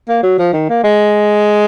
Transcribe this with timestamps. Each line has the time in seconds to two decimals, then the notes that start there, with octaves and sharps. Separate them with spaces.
0.09 A#3
0.23 F#3
0.39 F3
0.53 D#3
0.69 A#3
0.84 G#3